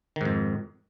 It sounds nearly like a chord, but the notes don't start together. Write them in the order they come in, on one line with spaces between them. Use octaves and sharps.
D#3 G#2 F2